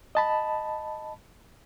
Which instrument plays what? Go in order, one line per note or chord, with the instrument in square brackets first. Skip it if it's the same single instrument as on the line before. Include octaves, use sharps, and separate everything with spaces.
[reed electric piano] D#5 A5 B5